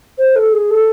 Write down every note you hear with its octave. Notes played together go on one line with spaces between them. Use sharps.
C5
A4
G#4
A4